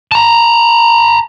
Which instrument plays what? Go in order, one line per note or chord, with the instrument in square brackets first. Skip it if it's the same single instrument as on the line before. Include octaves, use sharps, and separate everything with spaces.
[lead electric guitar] A5 A#5